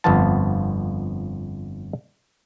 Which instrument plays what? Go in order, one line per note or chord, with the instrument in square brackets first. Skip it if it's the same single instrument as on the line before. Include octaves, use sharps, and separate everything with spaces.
[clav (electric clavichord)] G1 F2 F3 B3 F4 A5